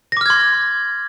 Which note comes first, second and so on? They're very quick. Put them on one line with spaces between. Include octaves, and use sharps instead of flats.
A#6 D6 F6 G#6 C6